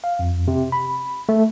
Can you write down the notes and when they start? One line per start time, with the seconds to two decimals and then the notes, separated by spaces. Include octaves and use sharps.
0.04 F5
0.19 F2
0.48 C3
0.72 B5
1.29 A3